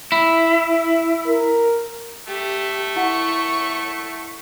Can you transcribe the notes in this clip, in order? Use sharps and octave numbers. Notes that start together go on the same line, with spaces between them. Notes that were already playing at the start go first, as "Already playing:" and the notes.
E4
A#4
A3 G4
E4 F#5 C#6